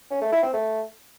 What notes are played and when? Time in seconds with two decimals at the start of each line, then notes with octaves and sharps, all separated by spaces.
0.11 C#4
0.21 A3
0.32 E4
0.43 C4
0.53 A3